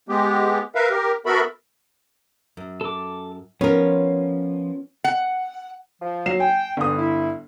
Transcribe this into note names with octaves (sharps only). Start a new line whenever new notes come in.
G#3 B3 G4
A#4 B4 E5 F5
G4 A#4
B3 F#4 A4 A#4 E5 B5
F#2
A4 D6
F3 B3 C#4 A#4
F#5
F3
F#3 C7 E7
G5 G#5
G1 G2 E3 D#6
E4